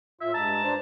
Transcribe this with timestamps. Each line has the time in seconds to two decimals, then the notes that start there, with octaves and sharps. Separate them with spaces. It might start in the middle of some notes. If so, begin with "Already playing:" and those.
0.21 A2 F4 E5
0.34 G2 G#3 A5 A#5
0.63 D4 C5 A#5